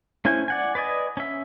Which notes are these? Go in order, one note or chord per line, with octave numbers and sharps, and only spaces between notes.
A3 C#4 E4 C5 G#5
D5 F#5 G#5
B4 D5 D#5 G#5
C#4 E5